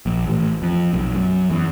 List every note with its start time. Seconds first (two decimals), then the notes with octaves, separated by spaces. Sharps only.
0.06 A#1
0.27 A1
0.62 F2
0.94 B1
1.15 F#2
1.50 E2